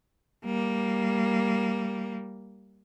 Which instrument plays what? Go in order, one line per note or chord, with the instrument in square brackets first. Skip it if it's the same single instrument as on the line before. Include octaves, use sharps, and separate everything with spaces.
[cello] G3 A#3